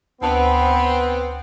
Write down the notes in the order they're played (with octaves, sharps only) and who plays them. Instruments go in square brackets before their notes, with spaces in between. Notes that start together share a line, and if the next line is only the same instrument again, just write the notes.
[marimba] D2 A5 [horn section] B3 C4